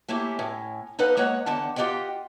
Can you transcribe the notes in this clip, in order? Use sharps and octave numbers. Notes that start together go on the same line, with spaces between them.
A3 A#3 C#4 E4 G4
A2 C#4
D#4 A4 B4 D#5 F5 F#5
G#3 A#3 C#5 D#5 F#5
E2 D3 D#3 F#5 A5
F4 G4 D#5 F#5 G5